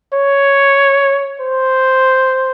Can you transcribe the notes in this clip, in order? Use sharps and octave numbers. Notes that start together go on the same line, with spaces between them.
C#5
C5